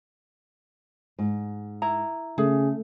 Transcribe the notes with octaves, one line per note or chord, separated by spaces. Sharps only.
G#2
E4 A#5
C#3 A3 G#4